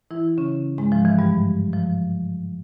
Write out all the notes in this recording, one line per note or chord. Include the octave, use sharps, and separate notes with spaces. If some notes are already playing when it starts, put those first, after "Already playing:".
E3 E4
C#3 C#4
G#2 G#3
F3
E3
G2 G3
F3